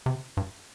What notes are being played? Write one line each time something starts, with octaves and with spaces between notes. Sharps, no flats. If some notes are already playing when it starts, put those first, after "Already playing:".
C3
G2